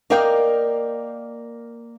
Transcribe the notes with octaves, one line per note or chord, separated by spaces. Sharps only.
A#3 A#4 D5 D#5 F5 G5